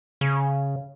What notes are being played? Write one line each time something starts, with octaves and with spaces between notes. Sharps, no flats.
C#3